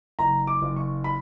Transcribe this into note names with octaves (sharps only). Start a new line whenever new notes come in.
F#1 A#5
D6
F#1
C#6
B5